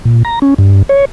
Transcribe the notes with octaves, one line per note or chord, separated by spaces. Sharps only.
A#2
A#5
C#4
G2
C#5